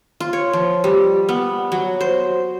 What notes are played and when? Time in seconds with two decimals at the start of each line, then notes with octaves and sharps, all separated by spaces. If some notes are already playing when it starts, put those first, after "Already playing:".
0.20 F4
0.33 C#5
0.53 F3
0.84 G3
1.29 B3
1.72 F#3
2.01 C5